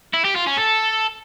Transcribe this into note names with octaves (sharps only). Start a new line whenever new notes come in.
E4
G4
F4
C#4
A4